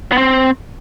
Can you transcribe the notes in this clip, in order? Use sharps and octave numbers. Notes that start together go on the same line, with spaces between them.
B3
C4